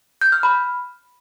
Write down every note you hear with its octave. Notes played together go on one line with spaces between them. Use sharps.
G6
F6
B5